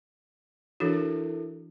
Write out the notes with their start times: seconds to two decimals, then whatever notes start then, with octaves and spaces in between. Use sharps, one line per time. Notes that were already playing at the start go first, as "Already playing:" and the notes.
0.80 E3 D4 E4 F#4 A4 A#4